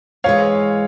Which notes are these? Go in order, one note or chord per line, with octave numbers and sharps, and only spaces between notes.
G#2 E3 G#3 C#5 F5